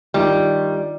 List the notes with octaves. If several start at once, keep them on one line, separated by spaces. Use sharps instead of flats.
G2 D#3 G3 F4